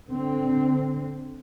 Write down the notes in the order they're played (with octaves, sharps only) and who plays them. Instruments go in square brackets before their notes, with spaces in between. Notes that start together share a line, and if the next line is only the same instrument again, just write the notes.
[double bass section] D3 C4